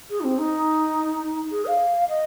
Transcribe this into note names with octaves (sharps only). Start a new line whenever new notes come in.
G#4
D#4
C4
D#4
G#4
F5
D#5